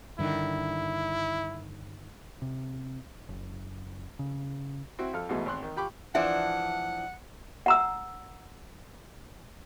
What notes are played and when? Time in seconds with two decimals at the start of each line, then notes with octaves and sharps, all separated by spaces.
0.19 G2 D3 D#3 E4
2.42 C3
3.29 F#1
4.19 C#3
4.99 C4 E4 F#4
5.13 F2 A4 F6
5.29 G#2 B2 E3 F#3 G#3 A3
5.46 G#1 C4 C6 F#6
5.63 D#3
5.76 F4 G4 G5 B5 C#6 D6
6.15 E3 F3 D4 E5 F#5
7.66 F#5 A#5 E6